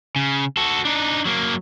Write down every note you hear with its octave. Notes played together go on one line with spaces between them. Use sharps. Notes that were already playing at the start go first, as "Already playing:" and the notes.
C#3
F#4 A4
D4 D#4
F#3 A#3